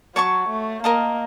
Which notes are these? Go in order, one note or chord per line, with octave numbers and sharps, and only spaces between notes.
F#3 C#5 A5 C#6
A3
A#3 A#4 D#5 A5